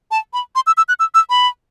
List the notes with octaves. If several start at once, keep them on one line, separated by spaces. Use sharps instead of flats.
A5
B5
C6
E6
E6
F#6
E6
E6
B5